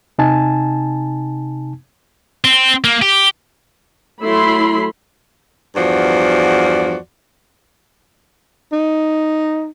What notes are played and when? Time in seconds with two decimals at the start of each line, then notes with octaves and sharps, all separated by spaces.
0.19 C3 D#4 G#5 A5
2.44 C4
2.84 A#3
3.02 G4
4.24 F#3 A3 E4 B5 C6
5.76 E2 G2 F3 F#4 D5
8.73 D#4